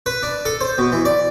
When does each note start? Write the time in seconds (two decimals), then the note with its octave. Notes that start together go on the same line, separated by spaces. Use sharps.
0.06 B4
0.23 D4
0.45 A4
0.61 C5
0.78 B2
0.92 E3
1.05 D5